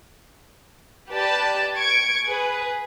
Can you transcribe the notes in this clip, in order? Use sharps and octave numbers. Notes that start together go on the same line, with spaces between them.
G4 B4 D5 A5
C#6 G#6 D7
G#4 B4